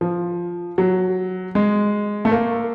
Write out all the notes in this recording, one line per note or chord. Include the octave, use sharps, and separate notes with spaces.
F3
F#3
G#3
A3
A#3